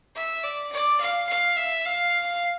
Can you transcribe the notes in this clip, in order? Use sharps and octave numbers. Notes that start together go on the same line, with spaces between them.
E5
D5
D5
F5
F5
E5
F5